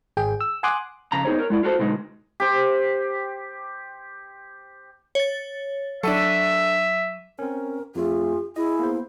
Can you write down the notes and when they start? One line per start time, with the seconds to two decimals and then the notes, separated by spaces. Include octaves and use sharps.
0.17 G#1 G#4 G5
0.41 E6
0.63 F#5 G#5 C6 D6 D#6 F#6
1.12 F2 C#3 A#5
1.25 B3 D#4 G#4 C5 C#5
1.39 A#4 C#5
1.50 G#3 E4 D5
1.63 F4 F#4 A4 C5
1.79 B2 D3 F#3 G#3 D#4
2.40 G4 C5
5.15 C#5 A6
6.03 F#3 D4 A4 E5 D#7 E7
7.39 C4 C#4 A#4
7.95 F2 A3 F4 G#4
8.56 E4 G#4 D#5
8.79 A#3 B3 C5